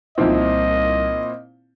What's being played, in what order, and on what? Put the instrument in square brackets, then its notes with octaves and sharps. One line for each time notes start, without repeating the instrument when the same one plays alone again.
[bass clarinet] C2 [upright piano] A#2 C4 E4 [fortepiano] D#3 F3 [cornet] D#5